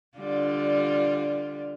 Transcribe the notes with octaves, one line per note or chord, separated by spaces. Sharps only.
D3 G3 F4